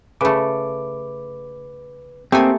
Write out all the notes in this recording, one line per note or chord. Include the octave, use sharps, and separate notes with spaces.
C#3 A3 B4 D6
A3 A#3 C4 D#4 G4 G#5